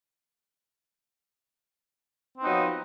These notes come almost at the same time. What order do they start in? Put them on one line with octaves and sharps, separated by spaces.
C4 B3 D#4 F#3 F3